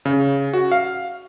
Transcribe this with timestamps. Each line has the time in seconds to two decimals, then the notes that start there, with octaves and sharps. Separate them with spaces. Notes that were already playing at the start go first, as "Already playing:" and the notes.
0.05 C#3
0.53 F#4
0.72 F5